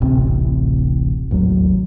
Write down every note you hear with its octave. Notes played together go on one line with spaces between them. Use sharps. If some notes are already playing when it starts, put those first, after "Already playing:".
D1 A1 C3 C4
A1 D#2 F#3